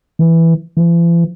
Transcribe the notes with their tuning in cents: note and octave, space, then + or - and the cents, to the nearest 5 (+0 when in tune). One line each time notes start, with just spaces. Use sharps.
E3 +0
E3 +45